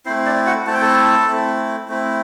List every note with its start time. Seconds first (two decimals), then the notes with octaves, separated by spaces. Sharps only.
0.06 A3 C4 E4 C5
0.26 D4 D5
0.46 F#4 F#5
0.67 A3 C4 E4 A5
0.74 G5
0.82 A4 A5
1.27 A3 C4 E4
1.88 A3 C4 E4